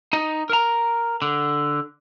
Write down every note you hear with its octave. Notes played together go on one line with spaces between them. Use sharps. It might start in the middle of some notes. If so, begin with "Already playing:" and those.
D#4 D#5
A#4 A#5
D3